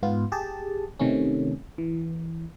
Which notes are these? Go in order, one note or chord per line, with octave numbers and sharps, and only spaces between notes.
G#2 B3 F4
G4 G#4 A5
C3 D#3 A3 C#4
E3